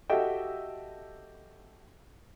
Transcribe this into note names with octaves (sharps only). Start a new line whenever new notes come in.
F#4 G4 A4 D#5 E5 G5